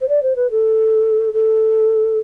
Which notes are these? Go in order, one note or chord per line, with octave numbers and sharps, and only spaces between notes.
C5
D5
C5
B4
A4
A4